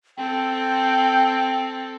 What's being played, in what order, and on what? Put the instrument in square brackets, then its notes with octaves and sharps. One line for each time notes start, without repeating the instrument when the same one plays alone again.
[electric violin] C4 A4 [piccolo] G5